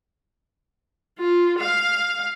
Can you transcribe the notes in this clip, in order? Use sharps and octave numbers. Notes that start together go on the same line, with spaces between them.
F4
F5